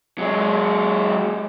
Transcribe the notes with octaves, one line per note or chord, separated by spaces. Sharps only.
F#3 G#3